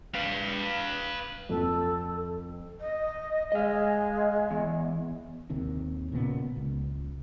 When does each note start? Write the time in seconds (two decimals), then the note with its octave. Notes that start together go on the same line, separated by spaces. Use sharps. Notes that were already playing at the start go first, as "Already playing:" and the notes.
0.14 B4 F5
1.49 F2 A4
2.80 D#5
3.52 G#3 D#5 F5
4.51 E2
5.50 D#2 C3 D#3
6.12 A#2 C#3 B3
6.57 C#2